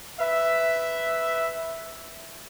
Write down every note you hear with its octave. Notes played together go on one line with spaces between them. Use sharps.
B4 E5